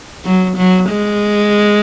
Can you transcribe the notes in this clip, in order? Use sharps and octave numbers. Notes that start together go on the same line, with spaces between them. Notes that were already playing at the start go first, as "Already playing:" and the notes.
F#3
F#3
G#3